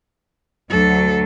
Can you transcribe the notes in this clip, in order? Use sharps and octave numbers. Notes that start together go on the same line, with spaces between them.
D2 F#3 A4